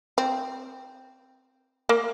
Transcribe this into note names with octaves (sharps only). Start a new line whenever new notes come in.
C4
A#3